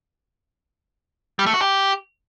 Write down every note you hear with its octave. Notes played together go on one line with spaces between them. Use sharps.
G3
A3
F#4
G4